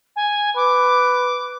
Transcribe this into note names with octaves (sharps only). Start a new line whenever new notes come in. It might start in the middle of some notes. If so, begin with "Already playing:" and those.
G#5
B4 D6